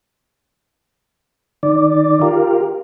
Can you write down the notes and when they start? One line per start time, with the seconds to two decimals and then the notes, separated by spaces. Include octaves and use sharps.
1.63 D#3 D5
2.22 F4 G4 A#4